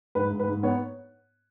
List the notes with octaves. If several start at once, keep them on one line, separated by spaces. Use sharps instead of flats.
G#2 B4
G#2
B4
G#2
B3 C#5